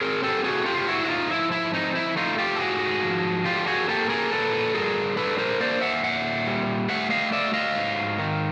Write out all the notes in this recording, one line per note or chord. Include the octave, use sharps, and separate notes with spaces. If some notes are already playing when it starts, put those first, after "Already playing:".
C4 G#4 A#4
G4 A4
A3 F#4 G#4
F4 G4
G4
G#2 E4 F#4
F#4
D#4 F4
F3 E4
E4
C4 D#4
E4
A3 D#4 F4
F4 G4
A4
G#2 F#4 G#4
F3
D4 F4 G4
F#4 G#4
A#3 G4 A4
G#4 A#4
A#2 A4 B4
G3 G#4 A#4
D4 A4 B4
A#4 C5
A#3 C5 D5
E5 F#5
A#2 E5 F#5
G3
A3 E5 F#5
D#5 F5
F#3 D5 E5
D#5 F5
G#2
D#3